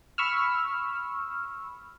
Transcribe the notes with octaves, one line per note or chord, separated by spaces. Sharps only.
B5 C#6 E6 F6